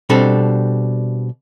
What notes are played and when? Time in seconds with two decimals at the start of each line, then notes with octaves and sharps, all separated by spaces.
0.10 B2 G3 C4 D4 A4